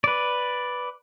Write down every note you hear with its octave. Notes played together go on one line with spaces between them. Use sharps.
B4 D5